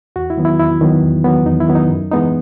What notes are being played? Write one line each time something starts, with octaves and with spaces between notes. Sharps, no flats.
E2 F#4
E4
D#3 F#3 B3
E4
E2 E4
D#3 F#3 B3
E2
D#3 F#3 B3
E2 D#4
E4
D#3 F#3 B3
D#4
F#2
E3 G#3 B3 D#4